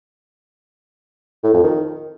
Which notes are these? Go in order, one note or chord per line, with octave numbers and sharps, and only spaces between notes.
A2
F2
D#3